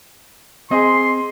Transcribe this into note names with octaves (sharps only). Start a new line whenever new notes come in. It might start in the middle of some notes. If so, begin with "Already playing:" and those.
C4 G#4 D#5 C6